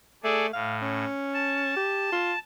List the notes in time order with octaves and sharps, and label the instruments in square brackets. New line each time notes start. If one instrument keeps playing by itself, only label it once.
[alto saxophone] A3 [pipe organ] G#4 A4 D5
[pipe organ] A2 [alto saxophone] F5
[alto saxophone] C#4
[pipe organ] A5
[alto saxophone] G4
F4